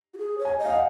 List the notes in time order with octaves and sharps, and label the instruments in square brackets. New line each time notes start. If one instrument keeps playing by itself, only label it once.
[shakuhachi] F#4
G#4
C#5
[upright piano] G#5
[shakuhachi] D#5
[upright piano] F5
F#5